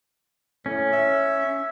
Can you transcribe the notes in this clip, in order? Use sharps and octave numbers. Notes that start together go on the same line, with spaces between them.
A2 C#4
E5